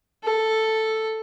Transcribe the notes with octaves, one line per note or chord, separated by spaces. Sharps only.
A4